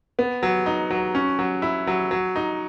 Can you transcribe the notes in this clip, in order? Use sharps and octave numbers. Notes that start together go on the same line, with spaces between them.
B3
F#3
D#4
F#3
C#4
F#3
E4
F#3
F#3
D#4